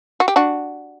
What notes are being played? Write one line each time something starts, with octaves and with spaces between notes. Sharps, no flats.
F#4
G4
D4 F#4